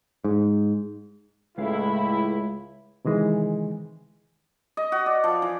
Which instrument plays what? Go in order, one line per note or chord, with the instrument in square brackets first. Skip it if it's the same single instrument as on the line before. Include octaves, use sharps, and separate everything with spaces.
[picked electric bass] G#2
[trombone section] C#2 [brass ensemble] A2 E4 [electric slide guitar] G#3 F5
[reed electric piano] C3 D#3 E3 G#3
[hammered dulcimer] D#5
F#4
D5
F3
E3